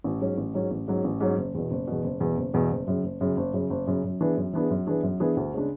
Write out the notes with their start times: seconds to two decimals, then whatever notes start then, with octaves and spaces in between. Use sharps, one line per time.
0.04 A1
0.21 G#2 F#3 C#4
0.38 A1
0.54 G#2 F#3 C#4
0.71 A1
0.88 G#2 F#3 C#4
1.04 A1
1.21 G#2 F#3 C#4
1.38 F#1
1.54 E2 B2
1.71 F#1
1.87 E2 B2
2.04 F#1
2.20 E2 B2
2.37 F#1
2.54 E2 B2
2.71 F#1
2.87 F#2 C#3
3.04 F#1
3.21 F#2 C#3
3.37 F#1
3.54 F#2 C#3
3.70 F#1
3.87 F#2 C#3
4.04 F#2
4.21 E3 B3 D4 G#4
4.37 F#2
4.53 E3 B3 D4 G#4
4.70 F#2
4.87 E3 B3 D4 G#4
5.03 F#2
5.20 E3 B3 D4 G#4
5.37 D2
5.54 C#3 G#3 D4